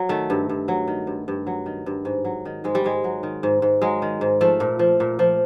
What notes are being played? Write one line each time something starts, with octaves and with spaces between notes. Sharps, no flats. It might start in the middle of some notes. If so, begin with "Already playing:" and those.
Already playing: F#3
D#3 A3
G2
G2
F#3
D#3
G2
G2
F#3
D#3
G2
G#2
F#3
D#3
G#2 G#3
G3
G#2 G#3
F#3
D#3
G#2
G#2
F#3 G#3
D#3
G#2
F3 A3
A#2
F3
A#2
F3